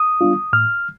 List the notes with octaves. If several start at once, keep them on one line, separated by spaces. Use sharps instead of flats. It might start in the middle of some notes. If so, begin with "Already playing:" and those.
Already playing: D#6
G3 B3 D4 F4
A2 F6